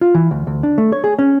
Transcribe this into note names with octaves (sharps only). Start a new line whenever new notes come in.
F4
E3
D2
D2
D4
A3
C#5
G#4
C#4